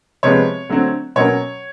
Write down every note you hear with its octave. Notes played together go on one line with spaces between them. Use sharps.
C3 F3 G#3 B3 C#5
D3 F#3 A3 C4
B2 F#3 A#3 C#4 C#5